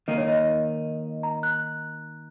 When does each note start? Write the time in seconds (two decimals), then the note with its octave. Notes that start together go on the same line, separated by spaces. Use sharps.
0.08 D#3 A#3 D#4 D#5
0.18 C#5
0.27 D#5
1.23 A#5
1.43 F#6